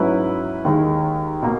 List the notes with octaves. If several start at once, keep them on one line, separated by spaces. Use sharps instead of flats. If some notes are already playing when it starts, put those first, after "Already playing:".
Already playing: G#2 F#3 C#4 E4 B4
D#2 D#3 G#3
B2 A#3